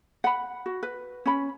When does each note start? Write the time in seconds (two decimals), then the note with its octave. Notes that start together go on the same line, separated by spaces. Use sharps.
0.24 F#5 B5
0.66 F#4
0.83 B4
1.26 C#4 B5